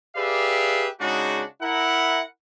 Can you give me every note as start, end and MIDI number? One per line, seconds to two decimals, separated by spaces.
0.16 0.86 67
0.16 0.86 68
0.16 0.86 71
0.16 0.86 74
0.16 0.86 76
0.16 0.86 77
0.99 1.42 49
0.99 1.42 56
0.99 1.42 62
0.99 1.42 63
0.99 1.42 66
1.61 2.22 64
1.61 2.22 70
1.61 2.22 78